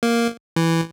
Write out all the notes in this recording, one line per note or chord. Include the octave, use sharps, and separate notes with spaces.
A#3
E3